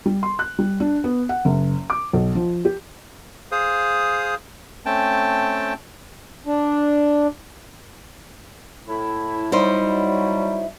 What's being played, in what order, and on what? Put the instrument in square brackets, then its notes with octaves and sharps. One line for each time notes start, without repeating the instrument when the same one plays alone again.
[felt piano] G3
C6
F#6
G3
D4
B3
F#5
F#1
D6
B1
F3
G4
[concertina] G#4 C5 F5 D#6
A3 C4 C#4 G5 A5
[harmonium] D4
[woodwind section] A2 E4
[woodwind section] F#3 G3 [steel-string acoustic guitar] D#4 E4 C5